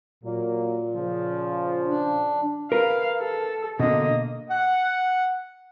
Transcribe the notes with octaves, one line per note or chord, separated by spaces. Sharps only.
A#2 F#3 A#3
C#3 F3
D4
A#4 B4 F5
A4
B2 D3 A#3 D#5
F#5